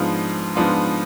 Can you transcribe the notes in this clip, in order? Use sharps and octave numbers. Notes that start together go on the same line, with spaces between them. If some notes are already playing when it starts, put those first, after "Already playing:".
Already playing: G#2 F3 B3 D4 F4
G#2 F3 B3 D4 F4